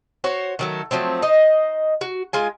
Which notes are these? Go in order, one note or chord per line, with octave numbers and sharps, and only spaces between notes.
F#4 C5 C#5
D#3 F#3 A3
F3 F#3 A3 C4
D#4 C5 D#5
F#4
G#3 F4 G#5